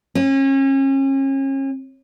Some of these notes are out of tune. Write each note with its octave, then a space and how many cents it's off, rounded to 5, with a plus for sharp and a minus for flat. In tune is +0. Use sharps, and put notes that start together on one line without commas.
C#4 -35